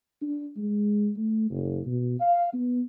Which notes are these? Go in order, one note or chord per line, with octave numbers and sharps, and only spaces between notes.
D4
G#3
A3
F#1
B2
F5
B3